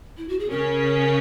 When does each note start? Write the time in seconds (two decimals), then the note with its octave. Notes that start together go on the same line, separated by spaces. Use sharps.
0.17 E4
0.28 F#4
0.39 G#4
0.50 C#3 C#4 A#4